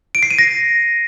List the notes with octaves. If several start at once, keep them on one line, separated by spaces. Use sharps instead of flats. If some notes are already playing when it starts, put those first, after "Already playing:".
D7
C7
D#7
A#6